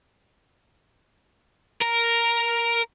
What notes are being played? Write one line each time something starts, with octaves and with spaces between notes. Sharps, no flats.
A#4